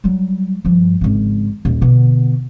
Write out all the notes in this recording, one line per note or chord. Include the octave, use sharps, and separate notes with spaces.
F#3 G3
G2 F3
G#1 C#3
D#1
B2 D3